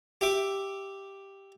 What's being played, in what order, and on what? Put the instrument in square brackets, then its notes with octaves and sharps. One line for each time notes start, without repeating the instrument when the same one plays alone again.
[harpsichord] G4 E5 D6